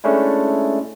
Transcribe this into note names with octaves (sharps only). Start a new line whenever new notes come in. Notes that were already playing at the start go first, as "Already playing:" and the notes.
G#3 A3 C#4 D4 E4